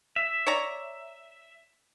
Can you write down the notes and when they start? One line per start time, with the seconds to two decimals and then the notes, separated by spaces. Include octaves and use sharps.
0.16 E5
0.47 C#5 D5 A#5